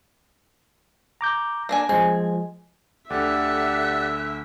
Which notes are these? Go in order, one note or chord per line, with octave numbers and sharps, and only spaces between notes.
A#5 D6 G6
A#3 D4 G#5
F3 G#3 C4 G#5
D2 D3 G4 A4 D5 E5 F#5 F#6